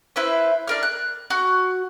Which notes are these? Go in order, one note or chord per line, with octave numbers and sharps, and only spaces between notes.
E4 B4 C5
D4 A#4 F6
F#6
F#4